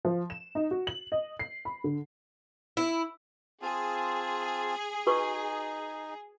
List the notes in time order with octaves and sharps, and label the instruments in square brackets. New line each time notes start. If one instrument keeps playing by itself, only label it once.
[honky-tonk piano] F3
E7
D#4
F#4
F#7
D#5
C7
B5
D3
[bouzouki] E4
[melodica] C4 F4 A5 [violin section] G#4
[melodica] D#4 [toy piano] F#4 B4 C#6